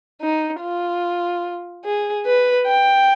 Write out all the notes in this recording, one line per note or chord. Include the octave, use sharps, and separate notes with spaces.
D#4
F4
G#4
B4
G5